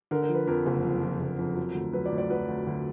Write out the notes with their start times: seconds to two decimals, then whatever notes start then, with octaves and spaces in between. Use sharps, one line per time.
0.11 D3 A#4
0.23 A#4
0.29 F3
0.35 B4
0.47 F2 A#4
0.66 F#1
0.84 F2
1.02 F3
1.20 F#1
1.38 F2
1.56 F#3
1.75 D2
1.93 F#3 B4
2.06 D5
2.12 D2
2.18 D5
2.30 F#3 B4
2.48 D2
2.67 D2